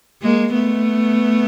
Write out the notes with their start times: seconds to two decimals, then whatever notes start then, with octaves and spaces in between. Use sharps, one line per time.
0.22 G#3 A#3
0.53 A3 B3